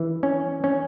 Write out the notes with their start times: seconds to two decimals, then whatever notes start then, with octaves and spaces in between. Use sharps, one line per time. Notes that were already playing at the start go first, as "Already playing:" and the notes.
Already playing: E3
0.23 C#4
0.64 C#4